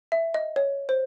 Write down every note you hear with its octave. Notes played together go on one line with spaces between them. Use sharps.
E5
D#5
C#5
C5